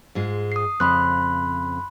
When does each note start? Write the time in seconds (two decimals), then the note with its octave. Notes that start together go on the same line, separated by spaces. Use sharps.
0.15 G#2 G#3 F4
0.52 D#6 C7
0.80 F2 C#3 C4 B5 C6 F#6